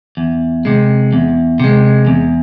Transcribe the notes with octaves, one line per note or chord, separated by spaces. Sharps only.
E2
C3 G#3
E2
C3 G#3
E2